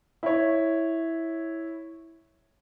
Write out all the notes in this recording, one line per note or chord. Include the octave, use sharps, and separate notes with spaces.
E4 C#5